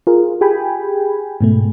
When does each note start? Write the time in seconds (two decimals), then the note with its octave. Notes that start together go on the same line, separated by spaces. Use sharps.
0.07 F4 G#4 A#4
0.41 G4 G#4 G5 G#5 B5
1.41 G#2 B2 A3